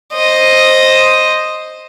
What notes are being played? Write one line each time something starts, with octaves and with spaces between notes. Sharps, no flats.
C5 D#5